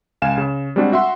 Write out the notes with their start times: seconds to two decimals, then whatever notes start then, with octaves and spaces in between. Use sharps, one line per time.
0.22 C#2 F5 G#5 E7
0.38 C#3
0.76 G3 G#3 C4 D4 F#4
0.92 F#4 E5 F#5 C6